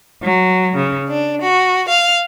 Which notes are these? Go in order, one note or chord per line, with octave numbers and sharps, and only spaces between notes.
F#3
C#3
D4
F#4
F5